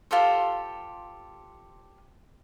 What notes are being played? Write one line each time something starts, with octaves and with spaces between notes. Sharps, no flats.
F4 G4 A4 C5